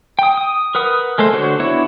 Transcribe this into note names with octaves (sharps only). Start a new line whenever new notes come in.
G5 D#6
D#6
A#4 B4 F#5 D#6
G#3 A3 A4 C5
D3 F#4 C5 C#5
B3 D4 E4 F#4 C#5